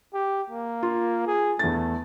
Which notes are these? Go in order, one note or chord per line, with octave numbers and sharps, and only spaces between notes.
G4
A#3
F4
G#4
E2 A3 A6